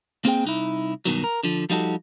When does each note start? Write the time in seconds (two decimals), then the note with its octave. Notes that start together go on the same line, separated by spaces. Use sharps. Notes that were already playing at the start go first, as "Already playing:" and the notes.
0.25 A#3 C4 G#4 G5
0.44 C2 D#4 E4
1.05 G2 B2 D#3 F#3
1.24 A#4
1.43 D3 F3
1.70 F3 G3 D#4 F#4 A4